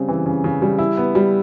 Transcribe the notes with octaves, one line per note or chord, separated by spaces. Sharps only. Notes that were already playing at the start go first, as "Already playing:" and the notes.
Already playing: C#3 G3 C4
E3
C#3
C#3
G3
E4
B3
G3